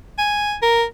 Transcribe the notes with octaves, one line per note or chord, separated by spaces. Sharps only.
G#5
A#4